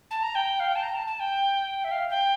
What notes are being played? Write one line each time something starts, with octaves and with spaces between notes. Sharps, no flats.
A5
A#5
G5
F5
G5
A5
A#5
A5
A5
G5
E5
F5
G5